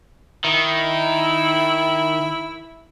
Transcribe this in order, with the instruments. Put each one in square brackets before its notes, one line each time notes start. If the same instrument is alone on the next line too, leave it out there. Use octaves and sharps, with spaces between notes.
[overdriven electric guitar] D#3 [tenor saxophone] E4